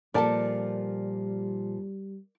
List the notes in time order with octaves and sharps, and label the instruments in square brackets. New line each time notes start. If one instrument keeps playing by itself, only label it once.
[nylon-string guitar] A#2 F3 A4 [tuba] G3 [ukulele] A#4 D5 A5